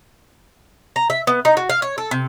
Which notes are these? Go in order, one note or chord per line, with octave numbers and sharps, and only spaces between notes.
A#5
E5
B3
D#4
F#4
F5
C#5
A4
C3